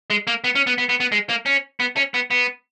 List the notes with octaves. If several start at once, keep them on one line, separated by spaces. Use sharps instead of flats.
G#3
A#3
B3
C#4
B3
B3
B3
B3
G#3
A#3
C#4
B3
C#4
B3
B3